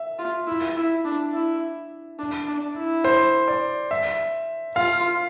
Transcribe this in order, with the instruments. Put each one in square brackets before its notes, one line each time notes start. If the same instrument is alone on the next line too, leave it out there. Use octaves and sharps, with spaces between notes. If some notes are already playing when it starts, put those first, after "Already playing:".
Already playing: [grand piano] E5
[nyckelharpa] F4
E4
E4
D4
E4
D4
D4
E4
[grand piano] C5
D5
E5
[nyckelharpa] F4 [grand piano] F5